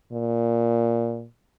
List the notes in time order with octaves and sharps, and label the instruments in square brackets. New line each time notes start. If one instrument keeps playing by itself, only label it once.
[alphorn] A#2